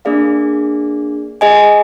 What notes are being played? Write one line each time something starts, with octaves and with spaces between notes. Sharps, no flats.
A#3 D4 G#4 D5 F5
G#4 D#5 G#5